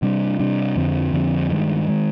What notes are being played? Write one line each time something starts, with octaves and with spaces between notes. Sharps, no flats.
C3 G3 D4
C3 G3 D4
F2 D3 F3 C4
F2 D3 F3 C4
G2 D#3 G#3
D#3 G#3